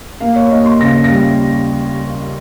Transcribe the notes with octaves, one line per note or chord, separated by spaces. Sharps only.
A#3 F5
C#5
D#2 D#5
C6
C#3 A#6
A#6
G3